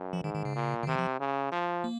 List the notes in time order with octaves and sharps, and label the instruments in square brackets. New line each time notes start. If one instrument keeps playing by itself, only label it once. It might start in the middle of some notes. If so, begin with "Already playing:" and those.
Already playing: [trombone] F#2
[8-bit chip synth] F3
[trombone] G#2 [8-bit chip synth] D#3
[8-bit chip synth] D#3
C#3
[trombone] A#2
[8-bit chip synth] C#3
[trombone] C3 [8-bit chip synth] D#3
[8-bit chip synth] F3
[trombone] C#3
F3
[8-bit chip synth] A#3